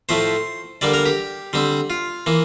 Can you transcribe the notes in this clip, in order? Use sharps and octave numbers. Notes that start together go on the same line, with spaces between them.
A2 F3 A3 C5
D3 G3 A#3 D5
A#4
G4
D3 G3 C4
F4
E3 A#3